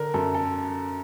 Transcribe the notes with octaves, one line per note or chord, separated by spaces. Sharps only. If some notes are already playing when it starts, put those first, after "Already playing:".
Already playing: D3 A#4
F#2 A4
A4